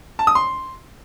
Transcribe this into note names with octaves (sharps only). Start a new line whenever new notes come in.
A5
D#6
C6